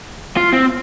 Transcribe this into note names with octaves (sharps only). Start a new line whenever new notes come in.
F4
C4